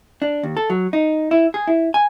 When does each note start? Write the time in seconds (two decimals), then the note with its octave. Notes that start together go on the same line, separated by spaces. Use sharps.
0.22 D4
0.43 D#2
0.57 A4
0.70 F#3
0.93 D#4
1.31 E4
1.54 G#4
1.67 E4
1.94 G#5